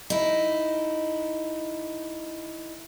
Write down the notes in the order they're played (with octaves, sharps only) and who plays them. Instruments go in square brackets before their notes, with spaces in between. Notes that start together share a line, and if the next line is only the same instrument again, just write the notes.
[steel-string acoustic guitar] D#4 E4